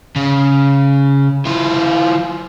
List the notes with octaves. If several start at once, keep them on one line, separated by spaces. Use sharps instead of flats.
C#3
E3 F4